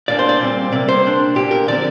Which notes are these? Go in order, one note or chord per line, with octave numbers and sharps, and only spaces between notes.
A#2 A#3 D4 D5
C5
D5
A#2 G3 C4
C3 G3 A#3 D5
C5
C3 A#3 D4
A#2 A#3 D4 G4
A#4
D3 F3 C4 D5